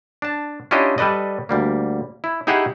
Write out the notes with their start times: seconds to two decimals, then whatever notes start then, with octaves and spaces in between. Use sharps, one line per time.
0.22 D4 A5
0.71 C#4 D4 E4 F4 G4 D#5
0.98 G3 A4 B4 D5 D#5
1.49 D2 G3 A#3
2.24 E4
2.47 D#4 E4 G4 G#4 E5 F#5